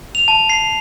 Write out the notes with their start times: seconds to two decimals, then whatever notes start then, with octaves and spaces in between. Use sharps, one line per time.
0.15 F7
0.28 A5
0.50 C7